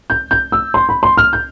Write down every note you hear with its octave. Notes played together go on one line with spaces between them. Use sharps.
G6
G6
E6
C6
B5
C6
F6
G6